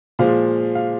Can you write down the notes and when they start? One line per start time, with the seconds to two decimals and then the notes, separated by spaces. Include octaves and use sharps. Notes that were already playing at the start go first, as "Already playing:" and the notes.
0.19 A#2 F3 G#3 F5
0.75 F5